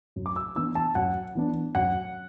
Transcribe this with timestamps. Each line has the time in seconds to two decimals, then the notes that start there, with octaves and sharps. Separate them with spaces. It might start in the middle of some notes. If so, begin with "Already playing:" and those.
0.16 F#2
0.26 D6
0.36 E6
0.56 E3 B3 D4 E6
0.75 A5
0.95 F#2 F#5
1.35 E3 B3 D4
1.75 F#2 F#5